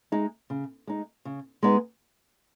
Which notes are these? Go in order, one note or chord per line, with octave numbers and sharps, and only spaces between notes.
G#3 D#4
C#3
G#3 D#4
C#3
G#3 B3 D#4